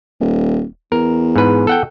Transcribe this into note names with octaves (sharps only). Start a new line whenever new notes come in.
D#1
E2 A#4
G#2 B4
A4 F#5 G5